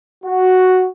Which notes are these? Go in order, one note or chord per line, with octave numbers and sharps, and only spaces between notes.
F#4